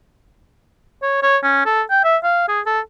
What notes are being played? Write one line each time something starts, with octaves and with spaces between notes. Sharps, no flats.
C#5
C#5
C#4
A4
G5
E5
F5
G#4
A4